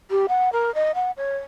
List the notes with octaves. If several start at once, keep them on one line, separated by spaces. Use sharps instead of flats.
G4
F#5
A#4
D#5
F#5
C#5